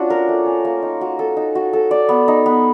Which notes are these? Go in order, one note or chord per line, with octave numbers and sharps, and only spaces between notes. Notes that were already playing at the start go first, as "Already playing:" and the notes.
Already playing: C#4 D4 F4 F#4
A#4
A3
C#4
A#3
D#4
F#4
A4
D#4
F#4
A4
D5
B3
D#4
B3